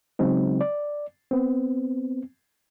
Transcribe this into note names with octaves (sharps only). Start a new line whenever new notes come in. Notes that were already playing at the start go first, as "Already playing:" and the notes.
C#3 F#3 G#3 C4 D#4
D5
B3 C4